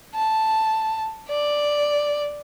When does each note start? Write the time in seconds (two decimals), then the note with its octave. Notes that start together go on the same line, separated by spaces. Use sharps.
0.14 A5
1.29 D5